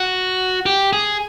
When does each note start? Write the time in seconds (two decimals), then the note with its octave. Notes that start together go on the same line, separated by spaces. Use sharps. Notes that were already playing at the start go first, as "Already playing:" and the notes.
Already playing: F#4
0.66 G4
0.93 G#4